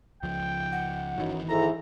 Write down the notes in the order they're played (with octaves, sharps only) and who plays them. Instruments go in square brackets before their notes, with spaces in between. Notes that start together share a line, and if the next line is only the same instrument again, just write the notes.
[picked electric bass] C#2 F3 [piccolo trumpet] G5
[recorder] F#5
[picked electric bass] G1 D#3 E3 [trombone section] F#2 F#3 D#4
[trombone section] G#2 E4 [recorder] A4 [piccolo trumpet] A#5